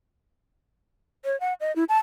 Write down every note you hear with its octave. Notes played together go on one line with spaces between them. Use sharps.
C#5
F#5
D#5
E4
A5